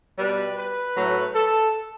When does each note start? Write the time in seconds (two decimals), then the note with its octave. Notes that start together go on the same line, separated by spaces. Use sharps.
0.18 B2 G3 B4
0.56 B4
0.95 A2 F#3 A3
1.35 A4